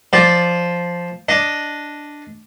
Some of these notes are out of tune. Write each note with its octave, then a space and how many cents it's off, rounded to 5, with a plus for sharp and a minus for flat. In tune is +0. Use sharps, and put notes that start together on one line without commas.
F3 +0 D5 +0
D4 +0 D#5 +0